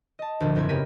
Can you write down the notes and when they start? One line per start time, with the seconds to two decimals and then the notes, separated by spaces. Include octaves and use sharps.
0.19 D#5 A5
0.40 D2 A#2 F3
0.55 G#1 F#2 C4 E4 G#6
0.69 C#3 B3 G4 A#4 B6 D#7